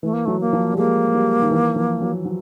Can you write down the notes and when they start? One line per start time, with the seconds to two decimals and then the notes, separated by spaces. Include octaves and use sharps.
0.03 E3 A3
0.13 A#3
0.25 F#3 A3
0.41 A#3
0.53 F3
0.73 G3
0.78 G#3 A#3
1.15 G3
1.42 D#3
1.51 E3
1.76 F3
2.01 F#3
2.26 F#3